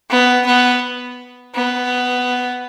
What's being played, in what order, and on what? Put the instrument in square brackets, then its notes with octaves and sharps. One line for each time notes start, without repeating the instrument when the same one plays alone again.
[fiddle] B3
B3
B3